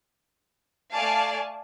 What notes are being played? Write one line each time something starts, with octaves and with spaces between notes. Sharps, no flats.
A3 D5 F5 G#5 A5